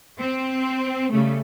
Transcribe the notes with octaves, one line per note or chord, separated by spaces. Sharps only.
C4
C#3 G3 A3